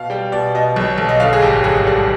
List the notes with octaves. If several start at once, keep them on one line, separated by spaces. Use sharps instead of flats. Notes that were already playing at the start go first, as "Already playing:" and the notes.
Already playing: B2 F5
G3 G5
B2 D5
B2 D#5
B1
B1
D#5
D3 F5
G#4
G#1 G4
G2 G#4
G3